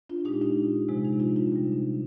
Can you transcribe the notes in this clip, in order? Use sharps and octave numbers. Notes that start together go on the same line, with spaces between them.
D4 F4
A#2 G#3 D#4 G4
D4 F4
C3 F3 G#3
D#4
D4 F4
D4 F4
C3 G3 D#4
D4